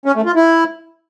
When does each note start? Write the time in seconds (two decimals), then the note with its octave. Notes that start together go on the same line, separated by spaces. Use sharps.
0.06 C#4
0.16 A3
0.26 F4
0.36 E4